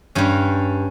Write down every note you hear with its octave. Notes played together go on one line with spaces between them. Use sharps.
G2 G3 C#4